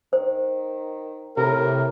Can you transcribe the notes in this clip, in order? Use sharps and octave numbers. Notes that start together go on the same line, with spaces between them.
D#3 C5
A2 C3 A#4